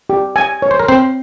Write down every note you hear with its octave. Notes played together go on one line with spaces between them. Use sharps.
G4
G#5
C#5
C5
A#4
C4 C5 C6